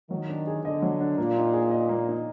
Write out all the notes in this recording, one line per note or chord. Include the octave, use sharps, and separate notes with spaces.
D#3 F#3
D4
G#4
D3 D#5
F#3
D4
A#2 A#3
D#4
G#4
D#5
A#3
D#4